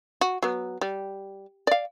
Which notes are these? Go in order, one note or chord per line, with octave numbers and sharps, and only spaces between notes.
F#4
F#3 B3
G3
D5 F5